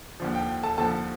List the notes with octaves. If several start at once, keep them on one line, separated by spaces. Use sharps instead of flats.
D#2 D3 F3
G5
A4 A5
D#2 D3 F3 A4 A5